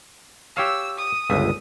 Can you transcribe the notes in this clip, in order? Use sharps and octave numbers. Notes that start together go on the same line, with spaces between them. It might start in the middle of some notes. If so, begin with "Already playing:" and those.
G4 C#5 F5 E6
D#6
G1 C#2 E5